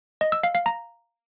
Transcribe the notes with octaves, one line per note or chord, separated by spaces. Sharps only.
D#5
E6
F5
F5
A#5